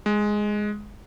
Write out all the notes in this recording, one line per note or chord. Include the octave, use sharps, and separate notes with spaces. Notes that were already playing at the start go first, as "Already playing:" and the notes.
G#3